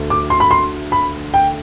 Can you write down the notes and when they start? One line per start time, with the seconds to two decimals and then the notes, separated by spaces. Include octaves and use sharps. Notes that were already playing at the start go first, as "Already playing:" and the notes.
Already playing: D2 A3
0.10 D6
0.30 C6
0.40 B5
0.51 C6
0.92 B5
1.34 G5